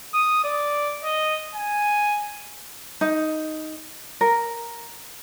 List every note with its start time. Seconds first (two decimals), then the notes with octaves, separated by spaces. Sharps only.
0.14 D#6
0.44 D5
1.04 D#5
1.55 G#5
3.01 D#4
4.21 A#4